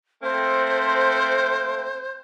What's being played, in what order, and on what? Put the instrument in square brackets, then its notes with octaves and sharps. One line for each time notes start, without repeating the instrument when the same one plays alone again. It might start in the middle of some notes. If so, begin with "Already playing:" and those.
[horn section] A3 A#3 C4 [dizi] C5